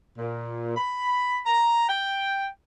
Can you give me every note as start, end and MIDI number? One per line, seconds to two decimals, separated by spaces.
0.18 0.76 46
0.76 1.39 83
1.46 1.85 82
1.89 2.46 79